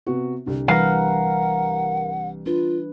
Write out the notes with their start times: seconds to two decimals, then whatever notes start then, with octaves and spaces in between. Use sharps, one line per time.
0.06 C3 B3 F#4
0.46 C2 D3
0.68 E3 G3 A#4 B4 F5 F#5
2.46 D4 F4 B4